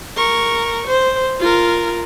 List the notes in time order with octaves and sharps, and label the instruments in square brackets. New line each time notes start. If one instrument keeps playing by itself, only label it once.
[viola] A#4 C#6
C5
F4 A#4